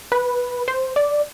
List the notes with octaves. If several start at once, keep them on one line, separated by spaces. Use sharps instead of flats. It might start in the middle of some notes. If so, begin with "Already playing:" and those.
B4
C5
D5